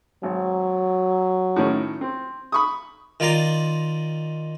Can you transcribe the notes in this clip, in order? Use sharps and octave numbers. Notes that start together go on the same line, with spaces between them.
G#1 F#3
A2 D#3 C#4
C4
B5 C#6 D#6
D#3 F4 D5 A#5 C6